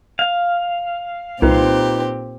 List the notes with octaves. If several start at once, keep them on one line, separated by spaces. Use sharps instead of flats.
F5
C2 A#2 C4 D#4 F4 G4 B4